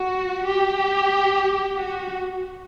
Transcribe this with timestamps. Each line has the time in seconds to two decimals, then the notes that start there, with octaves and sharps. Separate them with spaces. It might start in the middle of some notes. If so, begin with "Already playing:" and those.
Already playing: F#4
0.47 G4
1.78 F#4